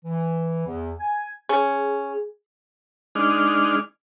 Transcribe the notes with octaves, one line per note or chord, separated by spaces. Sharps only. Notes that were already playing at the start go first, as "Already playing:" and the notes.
E3
E2
G#5
C#4 G#4
G#3 D4 D#4 F6